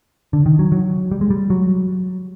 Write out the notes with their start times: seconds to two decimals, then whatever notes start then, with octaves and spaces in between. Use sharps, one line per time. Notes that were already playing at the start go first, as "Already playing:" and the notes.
0.33 D3
0.46 D#3
0.59 F#3
0.72 F#3
1.11 G3
1.21 G#3
1.30 G3
1.50 F#3